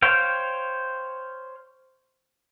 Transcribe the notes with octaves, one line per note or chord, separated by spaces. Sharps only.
C5 C#5 F5 G5